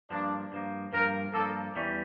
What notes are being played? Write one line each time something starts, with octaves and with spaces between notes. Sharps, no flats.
G2 F3 A#3 D4
G2 F3 A#3
G2 F3 A#3 A#4
G2 F3 A#3 A4
E2 E3 G3 C#4